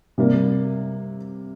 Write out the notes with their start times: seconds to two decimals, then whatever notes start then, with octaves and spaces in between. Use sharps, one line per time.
0.18 C3 G3 A#3